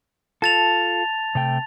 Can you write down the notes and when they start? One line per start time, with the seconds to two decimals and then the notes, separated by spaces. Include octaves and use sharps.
0.42 F4 A4 A5 A6 F7
1.35 C3 A3 G5